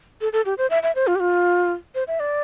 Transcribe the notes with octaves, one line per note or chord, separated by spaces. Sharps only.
A4
A4
G4
C5
E5
E5
C5
F4
G4
F4
C5
E5
D5